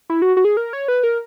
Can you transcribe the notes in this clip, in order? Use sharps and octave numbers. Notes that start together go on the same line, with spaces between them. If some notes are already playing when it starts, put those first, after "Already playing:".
E4
F#4
F#4
G#4
A#4
C#5
B4
A#4